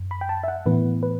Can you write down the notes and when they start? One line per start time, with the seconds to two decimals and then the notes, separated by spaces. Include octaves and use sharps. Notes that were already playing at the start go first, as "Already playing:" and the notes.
Already playing: F#2
0.11 B5
0.21 G5
0.29 A5
0.44 E5
0.48 F#5
0.66 A2 E3 B3 B4
1.03 B4